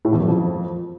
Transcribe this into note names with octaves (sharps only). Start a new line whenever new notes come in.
A2
E2
F#2
F2